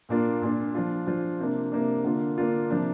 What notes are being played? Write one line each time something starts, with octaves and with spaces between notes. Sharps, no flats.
A#2 A#3 D4 F4
A#2 A#3 D4 F4
F3 D4 F4
F3 D4 F4
C3 A#3 D4
C3 A#3 D4
D3 A#3 D4 F4
D3 A#3 D4 F4
C3 F3 A#3 D4